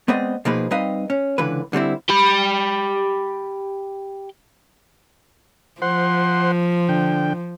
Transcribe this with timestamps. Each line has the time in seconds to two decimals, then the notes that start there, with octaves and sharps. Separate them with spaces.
0.08 G#3 B3 C4 D5 D#5
0.45 B2 F3 A#3 D#4 G#4 B4
0.71 G3 C4 D#4 B4 D#5 F5
1.10 C#4
1.38 C#2 D3 E3 B4
1.73 D3 G3 C4 E4
2.09 G4 B5
5.82 F3 C5 F#5 C6
6.89 D3 G5